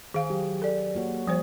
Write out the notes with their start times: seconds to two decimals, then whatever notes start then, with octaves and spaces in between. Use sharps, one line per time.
0.14 D#3 G#4 F5
0.30 F#3 G4
0.62 A4 D5
0.95 A#3 F#4 C#5
1.27 F3 G3 A#3 C5